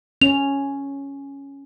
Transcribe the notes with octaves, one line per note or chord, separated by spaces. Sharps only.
C#4 F7